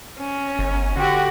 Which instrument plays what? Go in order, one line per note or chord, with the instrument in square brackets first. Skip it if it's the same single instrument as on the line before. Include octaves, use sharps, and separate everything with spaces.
[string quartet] C#4
[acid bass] G1
[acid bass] D3 [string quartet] F#4 G4